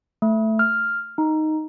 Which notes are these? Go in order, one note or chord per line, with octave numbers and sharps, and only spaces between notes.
A3
F6
D#4